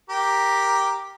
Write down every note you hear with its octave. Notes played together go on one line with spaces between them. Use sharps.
G4 A#4